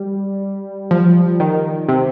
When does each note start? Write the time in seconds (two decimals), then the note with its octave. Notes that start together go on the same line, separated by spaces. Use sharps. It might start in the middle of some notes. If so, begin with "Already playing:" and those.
Already playing: G3
0.91 F3
1.40 D#3
1.89 C3